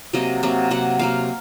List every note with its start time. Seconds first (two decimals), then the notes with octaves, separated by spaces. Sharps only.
0.13 C3 F#3 A#3 D#5
0.43 C3 F#3 A#3
0.70 C3 F#3 A#3 F#5
0.99 C3 F#3 A#3 F5